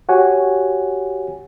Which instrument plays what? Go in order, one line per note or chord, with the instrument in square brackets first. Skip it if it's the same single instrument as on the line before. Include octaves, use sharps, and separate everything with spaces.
[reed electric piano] F#4 G4 C#5 F#5 G#5